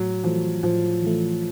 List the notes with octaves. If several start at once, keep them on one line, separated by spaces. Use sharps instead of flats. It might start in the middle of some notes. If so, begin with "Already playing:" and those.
Already playing: A2 F#3
E3 F3 A3
A2 F3
E3 A3